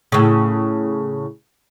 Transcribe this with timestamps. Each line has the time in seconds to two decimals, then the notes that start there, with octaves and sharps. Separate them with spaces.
0.12 A2 C#3